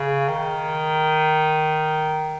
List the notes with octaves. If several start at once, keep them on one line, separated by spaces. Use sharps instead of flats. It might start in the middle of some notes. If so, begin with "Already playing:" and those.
Already playing: C#3
D#3